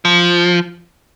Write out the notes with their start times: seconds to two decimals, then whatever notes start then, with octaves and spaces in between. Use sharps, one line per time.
0.05 F3